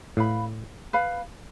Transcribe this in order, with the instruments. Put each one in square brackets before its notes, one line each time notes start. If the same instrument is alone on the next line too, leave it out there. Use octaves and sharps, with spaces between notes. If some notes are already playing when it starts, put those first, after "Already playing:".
[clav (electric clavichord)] A2 [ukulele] B4 F5 B5
[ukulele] B4 F5 B5